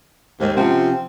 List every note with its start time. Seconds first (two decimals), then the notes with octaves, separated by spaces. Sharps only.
0.40 D#2 G#3 C5
0.57 C3 F3 C4 C#4 F#5